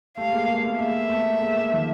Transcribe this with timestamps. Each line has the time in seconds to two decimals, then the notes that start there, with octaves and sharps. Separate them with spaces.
0.17 G3 A3 F5
0.33 G#3 A#3
0.48 G#3 A#3
0.63 A3 B3
0.79 G#3 A#3 E5
1.10 A3 B3
1.41 G#3 A#3
1.56 G#3 A#3
1.72 D#3 F3